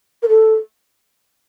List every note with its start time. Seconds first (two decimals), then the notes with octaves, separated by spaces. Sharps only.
0.23 A#4
0.29 A4